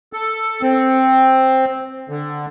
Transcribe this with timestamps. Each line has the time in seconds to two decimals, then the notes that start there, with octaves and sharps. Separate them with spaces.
0.13 A4
0.62 C4
2.09 D3